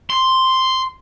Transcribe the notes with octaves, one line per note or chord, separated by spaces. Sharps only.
C6